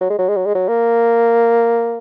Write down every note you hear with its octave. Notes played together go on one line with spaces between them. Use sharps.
F#3
G#3
F#3
G#3
F#3
G#3
F#3
A#3